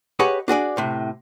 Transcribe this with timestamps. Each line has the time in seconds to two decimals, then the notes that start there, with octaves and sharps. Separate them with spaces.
0.19 G4 G#4 B4 C#5 D#5 F#5
0.48 D4 F#4 G#4 D5
0.77 A2 C3